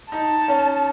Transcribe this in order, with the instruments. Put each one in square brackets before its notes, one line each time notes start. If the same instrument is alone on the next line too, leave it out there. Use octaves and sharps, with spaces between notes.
[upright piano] D#4 [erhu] A5
[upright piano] C#4